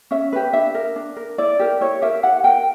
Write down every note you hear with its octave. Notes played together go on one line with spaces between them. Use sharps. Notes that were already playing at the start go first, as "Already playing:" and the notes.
C#4 E5
G4 B4
D4 E5
A#4
D4
A#4
E4 D5
G4 A#4
E4 C#5
G4 A#4 E5
E4 F#5
A#4 G5